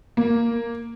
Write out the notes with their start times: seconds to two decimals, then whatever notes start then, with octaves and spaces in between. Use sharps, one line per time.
0.17 A#3